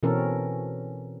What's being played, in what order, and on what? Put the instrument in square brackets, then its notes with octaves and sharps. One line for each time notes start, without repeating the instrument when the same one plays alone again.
[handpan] B2 E3 C4 C#4 A4 A#4